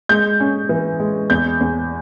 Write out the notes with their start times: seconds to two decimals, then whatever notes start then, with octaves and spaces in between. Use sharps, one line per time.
0.09 G#3 G6
0.40 C#4
0.69 E3
1.00 G#3
1.30 E2 G6
1.61 E2